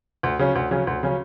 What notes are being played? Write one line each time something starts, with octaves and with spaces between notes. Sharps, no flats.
D2
C#3 F#3 C#4
D2
C#3 F#3 C#4
D2
C#3 F#3 C#4